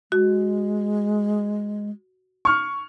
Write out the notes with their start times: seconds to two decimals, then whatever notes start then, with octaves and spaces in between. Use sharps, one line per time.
0.12 G#3 F#4
2.45 C#6 F6